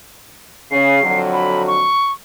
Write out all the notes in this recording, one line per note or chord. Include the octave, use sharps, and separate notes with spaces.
C#3 C7
F2 D3 F#3
B5
C#6